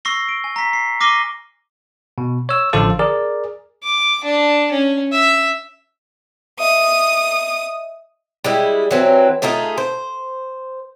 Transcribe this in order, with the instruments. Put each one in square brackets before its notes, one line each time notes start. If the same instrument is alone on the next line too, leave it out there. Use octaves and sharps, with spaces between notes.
[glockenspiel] C#6 E6 A#6 C7 G7
D7
G#5
A#5 B6
C7
D6 F6 A#6 C7 D#7 G7
[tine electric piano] B2
C#5 E6
A1 D3 F3 F4 A4 A5
G#4 A#4 D5
[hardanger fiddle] D6
D4
C#4
E5
[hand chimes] D#5 E5 [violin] D#6
[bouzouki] G3 G#3 E4
E3 F#3 C4
A3 D#4 F4 G#4
C5